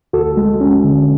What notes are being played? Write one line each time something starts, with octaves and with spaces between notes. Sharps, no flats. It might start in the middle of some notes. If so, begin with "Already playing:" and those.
D2 F#4 A4
G#3
C#4
D3